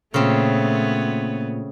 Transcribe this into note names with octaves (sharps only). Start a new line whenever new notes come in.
A#2 C#3 A3 B3 C4 C#5